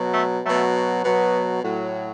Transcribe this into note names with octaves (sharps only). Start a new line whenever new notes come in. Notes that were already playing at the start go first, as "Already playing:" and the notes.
Already playing: B2 F#3
A3
B2 F#3 A3
B2 F#3 B3
A2 F#3